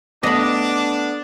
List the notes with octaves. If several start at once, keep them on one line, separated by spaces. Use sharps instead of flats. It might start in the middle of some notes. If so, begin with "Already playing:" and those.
A3 B3 D4 D#5 B5 D6